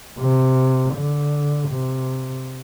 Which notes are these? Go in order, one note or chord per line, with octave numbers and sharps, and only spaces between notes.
C3
D3
C3